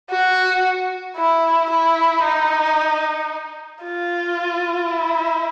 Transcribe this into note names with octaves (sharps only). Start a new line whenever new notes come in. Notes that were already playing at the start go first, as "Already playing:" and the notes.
F#4
E4
E4
D#4
F4
E4